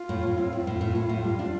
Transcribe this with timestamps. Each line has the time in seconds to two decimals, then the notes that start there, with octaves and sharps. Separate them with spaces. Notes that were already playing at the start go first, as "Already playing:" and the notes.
Already playing: F4
0.09 A2
0.23 A2
0.38 C4
0.53 A2
0.66 A2 F4
0.81 A2
0.95 A2
1.09 A2
1.24 G3
1.39 D4